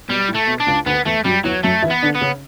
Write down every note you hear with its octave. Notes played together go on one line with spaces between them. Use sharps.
B2 G3
A2
A3
B2
D4
C#2 C#3
D2 D3 B3
E2 E3 A3
F#2 F#3 G3
E2 E3 F#3
F#2 F#3 A3
E3 E4
B3
D3 D4
B3
C#3 C#4